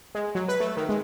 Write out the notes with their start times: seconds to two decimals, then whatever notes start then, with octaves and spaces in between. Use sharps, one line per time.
0.15 G#3
0.35 F#3
0.48 B4
0.60 A3
0.77 D#3
0.89 G#3